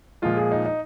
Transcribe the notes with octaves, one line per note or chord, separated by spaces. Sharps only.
A#2 F3 G#3 F4
G#4
D#4
D#4